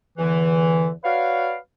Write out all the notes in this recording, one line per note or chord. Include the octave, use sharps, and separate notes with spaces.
E2 D3 E3
F#4 B4 C#5 D5 F5